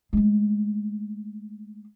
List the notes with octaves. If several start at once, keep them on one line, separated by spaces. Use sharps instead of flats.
G#3 A3